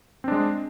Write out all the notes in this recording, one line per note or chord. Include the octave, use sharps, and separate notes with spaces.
G#3 C4 D4